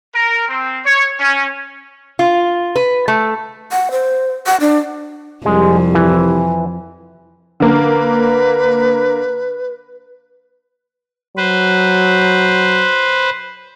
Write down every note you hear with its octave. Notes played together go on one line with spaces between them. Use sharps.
A#4
C4
C#5
C#4
F4
B4
A3
F#5
C5
F#5
D4
C2 F2 G3 G#3
E3
D3 A#3 B4
F#3 B4 C5